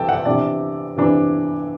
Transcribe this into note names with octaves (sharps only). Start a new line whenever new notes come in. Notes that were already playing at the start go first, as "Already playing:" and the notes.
Already playing: C3 E3 A3 G5 A5
F#5
C3 E3 B3 D4 D5
C3 E3 B3 D4